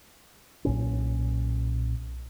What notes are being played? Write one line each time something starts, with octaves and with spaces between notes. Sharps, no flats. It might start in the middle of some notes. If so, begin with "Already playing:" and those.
B1 A#2 C#4